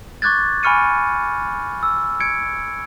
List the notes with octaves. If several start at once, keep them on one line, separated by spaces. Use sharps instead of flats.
C#6 D6 F#6 G#6 A6
G#5 B5 C#6 F6 C#7 D#7
E6
G#6 C#7 D7